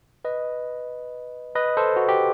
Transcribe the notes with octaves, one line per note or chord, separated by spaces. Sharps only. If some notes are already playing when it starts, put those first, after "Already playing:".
B4 D#5
B4 D#5
A4 C5
F#4
G4